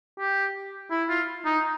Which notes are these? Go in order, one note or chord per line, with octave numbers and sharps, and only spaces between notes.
G4
E4
F4
D#4